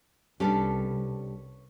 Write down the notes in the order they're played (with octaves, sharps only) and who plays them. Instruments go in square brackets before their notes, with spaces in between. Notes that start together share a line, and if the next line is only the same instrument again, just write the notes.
[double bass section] C2 [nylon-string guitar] G3 D4 [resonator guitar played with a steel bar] C#4 A4 B4